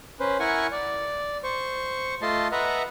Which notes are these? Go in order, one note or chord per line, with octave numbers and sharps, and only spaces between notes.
C#4 B4 C5
E4 A#4 F#5 G#5 C#6
D5
C5 C#6
A3 F4 D#5 A5 C6
B4 D#5 E5 F#5 A#5